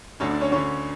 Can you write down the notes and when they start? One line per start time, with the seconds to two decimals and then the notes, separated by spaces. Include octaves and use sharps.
0.20 D2 D3 C#4 C#5
0.31 D4 D5
0.41 C#4 C#5
0.52 D2 D3 C#4 C#5